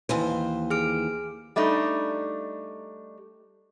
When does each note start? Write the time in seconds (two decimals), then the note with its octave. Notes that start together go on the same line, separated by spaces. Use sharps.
0.09 D#2 E3 C5
0.70 G#4 F6 D7
1.56 G3 A3 D4 D#4